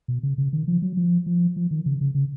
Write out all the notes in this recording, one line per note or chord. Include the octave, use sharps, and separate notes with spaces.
B2
C#3
C#3
D#3
F3
F#3
F3
F3
F3
D#3
C#3
C#3
C#3